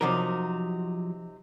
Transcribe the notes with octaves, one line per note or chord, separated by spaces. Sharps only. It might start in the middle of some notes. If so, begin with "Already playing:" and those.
C3 F3 F#3 D#4 A#4